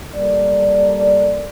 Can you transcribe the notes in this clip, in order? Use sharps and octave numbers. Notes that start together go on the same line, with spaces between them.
G3 A#3 A4 D5